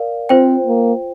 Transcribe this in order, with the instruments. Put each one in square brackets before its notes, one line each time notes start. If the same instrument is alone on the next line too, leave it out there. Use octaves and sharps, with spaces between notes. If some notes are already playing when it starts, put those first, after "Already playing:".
Already playing: [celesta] A#4 D5 F5
[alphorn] C4 [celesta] F4 C5 G5
[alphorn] A#3